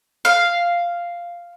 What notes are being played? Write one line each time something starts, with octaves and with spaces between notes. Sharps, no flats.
F5